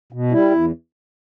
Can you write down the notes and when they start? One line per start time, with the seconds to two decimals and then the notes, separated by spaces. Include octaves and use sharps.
0.12 B2
0.32 G3 E4
0.51 E2